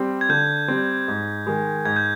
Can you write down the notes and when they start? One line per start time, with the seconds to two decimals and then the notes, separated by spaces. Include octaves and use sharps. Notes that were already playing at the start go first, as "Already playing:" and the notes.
Already playing: G3 C4
0.21 G#6
0.29 D3 G6
0.68 G3 C4
1.08 G#2
1.47 D#3 G#3
1.85 G#2 G#6
1.96 G6